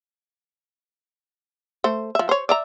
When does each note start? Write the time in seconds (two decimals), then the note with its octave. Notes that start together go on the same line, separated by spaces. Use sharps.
1.84 A3 C5
2.15 F3 E5
2.29 C5 C#5
2.49 D5 E5 A#5